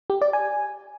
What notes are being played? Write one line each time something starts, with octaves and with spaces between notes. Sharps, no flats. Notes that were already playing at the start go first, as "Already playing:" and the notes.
G4
D5
G#5